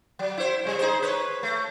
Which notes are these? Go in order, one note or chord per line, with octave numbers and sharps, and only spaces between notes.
F#3
E4 C5
C#3 G3
D#4 G#4 C5
B4 C#5
A3